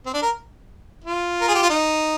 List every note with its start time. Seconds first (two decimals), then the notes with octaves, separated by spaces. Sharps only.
0.06 C4
0.14 D4
0.22 A#4
1.04 F4
1.41 A#4
1.48 G#4
1.55 G4
1.62 F4
1.70 D#4